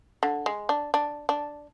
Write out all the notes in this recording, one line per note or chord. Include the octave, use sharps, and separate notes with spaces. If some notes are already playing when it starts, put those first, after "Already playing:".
D3
G#3
D4
D4
D4